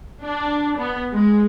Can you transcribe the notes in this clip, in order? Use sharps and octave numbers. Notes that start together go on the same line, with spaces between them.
D4
B3
G#3